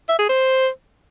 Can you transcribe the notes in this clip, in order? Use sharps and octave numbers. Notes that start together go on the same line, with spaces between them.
E5
G#4
C5